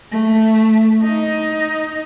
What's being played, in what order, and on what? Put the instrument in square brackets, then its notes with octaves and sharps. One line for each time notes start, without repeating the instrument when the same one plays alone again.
[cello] A3
D#4